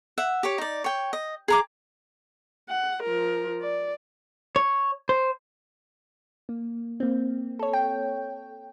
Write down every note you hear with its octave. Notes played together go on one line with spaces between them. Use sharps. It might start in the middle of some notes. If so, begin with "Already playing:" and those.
E5 F#5
G4 C#5
D#4 D5
C#5 G5
D#5
G#4 A#5 D6
F#5
F3 A#4
D5
C#5
C5
A#3
A#3 C4
A4 C#5
G5